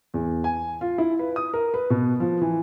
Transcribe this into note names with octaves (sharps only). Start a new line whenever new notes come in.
E2
G#5
F4
E4
B4
D#6
A#4
B4
B2
F3
E3